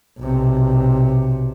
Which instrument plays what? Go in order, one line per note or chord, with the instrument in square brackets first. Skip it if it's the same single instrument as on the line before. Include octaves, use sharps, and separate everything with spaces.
[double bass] B1 C3